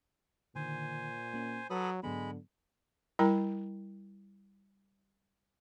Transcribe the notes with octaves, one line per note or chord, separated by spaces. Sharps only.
A#2 D3 D#3 C5 G#5
A#3 C#4
F#3 A4 B4 C#5 B5 D#6
G#2 D3 F#3 G#3 B3 B5
G3 E4 A#4 G5 A#5